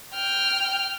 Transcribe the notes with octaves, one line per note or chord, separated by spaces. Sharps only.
G5 F6